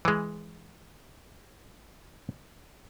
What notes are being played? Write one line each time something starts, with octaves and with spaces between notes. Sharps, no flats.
E3 G#3